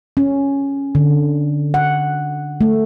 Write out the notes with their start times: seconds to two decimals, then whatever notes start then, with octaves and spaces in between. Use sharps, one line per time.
0.17 C#4
0.95 D3
1.74 F#5
2.61 A3